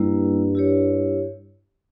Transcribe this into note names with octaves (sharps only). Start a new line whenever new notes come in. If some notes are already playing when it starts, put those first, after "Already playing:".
Already playing: G2 G3 A#3 E4
E4 G4 C#5